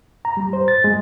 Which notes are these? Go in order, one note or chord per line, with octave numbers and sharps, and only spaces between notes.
A#5
G3
C5
A6
G#3